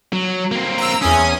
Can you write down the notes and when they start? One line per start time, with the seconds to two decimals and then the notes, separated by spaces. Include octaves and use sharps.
0.13 F#3
0.52 A#3 C4
0.78 A#5 E6
1.02 E2 C#4 G#5 D#6